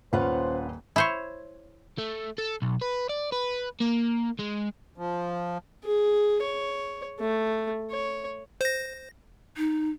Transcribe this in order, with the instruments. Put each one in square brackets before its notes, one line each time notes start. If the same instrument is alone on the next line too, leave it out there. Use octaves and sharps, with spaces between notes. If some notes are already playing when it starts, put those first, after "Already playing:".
[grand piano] D#1 B4 [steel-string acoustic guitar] C#4 F4 F#5 [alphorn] C5
[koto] E4 C5 C#5
[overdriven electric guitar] A3
A4
B1
B4
D5
B4
A#3
G#3
[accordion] F3
[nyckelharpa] G#4
C#5
A3
C#5
[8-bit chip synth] C5 A#6
[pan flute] D#4